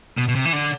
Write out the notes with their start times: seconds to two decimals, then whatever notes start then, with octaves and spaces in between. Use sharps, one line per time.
0.18 B2
0.28 B2
0.35 C3
0.45 E3
0.53 D3